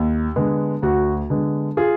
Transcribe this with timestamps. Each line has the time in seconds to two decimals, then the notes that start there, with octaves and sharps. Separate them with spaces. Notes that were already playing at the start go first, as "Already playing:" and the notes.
Already playing: D#2
0.36 D3 G#3 B3
0.82 D2 F#4
1.30 D3 G#3 B3
1.77 F4 G#4